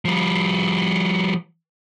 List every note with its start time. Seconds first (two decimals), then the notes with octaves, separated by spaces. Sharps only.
0.05 F3 G3